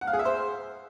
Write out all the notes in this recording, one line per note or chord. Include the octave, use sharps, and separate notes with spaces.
F#5
F5
G#4
E5
C5